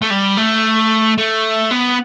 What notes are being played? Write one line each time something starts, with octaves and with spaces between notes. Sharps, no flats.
A3
G3
A3
A3
B3